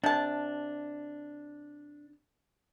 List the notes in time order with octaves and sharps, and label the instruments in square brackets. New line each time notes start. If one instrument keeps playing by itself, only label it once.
[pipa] C3 A5 [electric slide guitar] D4